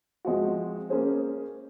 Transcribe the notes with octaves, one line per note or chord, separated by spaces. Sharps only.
F3 G#3 C4 F#4
A#3 C#4 G#4 C5